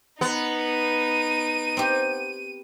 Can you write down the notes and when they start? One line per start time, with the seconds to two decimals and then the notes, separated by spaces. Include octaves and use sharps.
0.21 B3 D#4
0.64 D#7
1.77 C4 G4